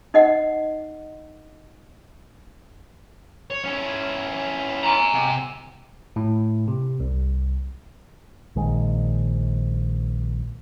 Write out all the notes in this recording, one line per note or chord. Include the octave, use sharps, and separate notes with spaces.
D#4 D#5 F#5
C#5
C#4 E4
G#5 A#5
C3
A2
C3
C2
A#1 D#3 G#3